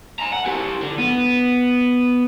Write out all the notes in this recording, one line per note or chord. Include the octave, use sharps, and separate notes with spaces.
G#5 A#5
F#5
E4 G4
D3
B3